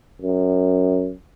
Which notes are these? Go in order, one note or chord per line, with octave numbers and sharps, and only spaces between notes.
F#2